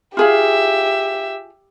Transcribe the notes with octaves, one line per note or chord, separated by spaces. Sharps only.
F4 G4 G#4 E5 F5